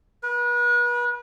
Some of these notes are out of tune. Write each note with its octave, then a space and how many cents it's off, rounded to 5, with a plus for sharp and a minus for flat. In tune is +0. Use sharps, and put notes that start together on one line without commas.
B4 -35